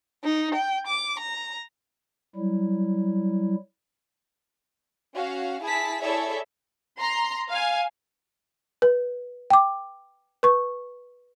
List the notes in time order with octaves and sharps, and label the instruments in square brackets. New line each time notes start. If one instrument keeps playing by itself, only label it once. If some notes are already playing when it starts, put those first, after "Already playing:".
[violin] D#4
G5
D6
A#5
[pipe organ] F#3 G3 E4
[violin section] C#4 F#4 F5
E4 G#4 A5 B6
E4 G#4 A4 C#5 D5 E5
A#5 C6
F5 G#5
[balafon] B4
G5 D6
B4 C#6